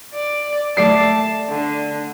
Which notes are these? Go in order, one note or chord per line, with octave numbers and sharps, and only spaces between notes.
D5
A3 D5 A5 C7
D3